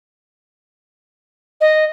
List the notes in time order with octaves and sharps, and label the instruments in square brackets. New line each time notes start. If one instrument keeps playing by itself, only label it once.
[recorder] D#5